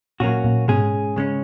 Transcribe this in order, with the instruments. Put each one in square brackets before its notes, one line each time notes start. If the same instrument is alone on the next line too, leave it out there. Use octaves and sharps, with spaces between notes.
[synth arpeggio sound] A#2 [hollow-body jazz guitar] F#3 A#3 C#4 F#4
[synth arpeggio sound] A#2
[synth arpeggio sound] G#2 B2 [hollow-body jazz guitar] G#3 C#4 G#4
[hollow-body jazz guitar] C#3 G#3 C#4